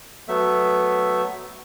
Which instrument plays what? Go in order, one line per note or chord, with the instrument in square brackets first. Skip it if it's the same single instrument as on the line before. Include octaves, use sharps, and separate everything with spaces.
[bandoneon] F#3 A3 B3 E5